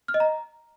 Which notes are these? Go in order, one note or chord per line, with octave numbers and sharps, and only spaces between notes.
F6
D#5
A#5